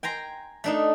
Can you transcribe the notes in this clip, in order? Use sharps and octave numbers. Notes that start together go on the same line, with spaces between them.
G5 G#5 A#5 C6
A3 D4 D#4